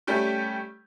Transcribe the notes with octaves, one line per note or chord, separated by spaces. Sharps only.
G3 A3 C#4 G4 C#5